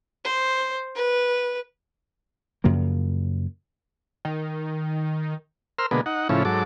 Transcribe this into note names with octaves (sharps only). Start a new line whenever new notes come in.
C5
B4
F#2 C#3 F3 A#3
D#3
A#4 C5 C6 E6 F6
B2 D3 G#3 A#3 B3
D#4 F#5
A2 C#3 F3 C#4 E4
G#2 F#3 A4 D6